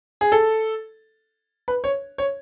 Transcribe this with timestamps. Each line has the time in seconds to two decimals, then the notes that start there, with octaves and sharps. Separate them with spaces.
0.21 G#4
0.32 A4
1.68 B4
1.84 C#5
2.18 C#5